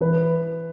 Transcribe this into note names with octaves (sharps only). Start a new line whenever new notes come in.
E3 B4